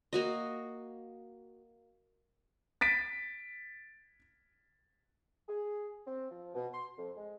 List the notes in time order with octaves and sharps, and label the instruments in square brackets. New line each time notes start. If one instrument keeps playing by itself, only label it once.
[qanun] A#3 F#4 D#5
[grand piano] A6 B6 D7
[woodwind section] G#4
C4
F3
B2
C6
F2
G#3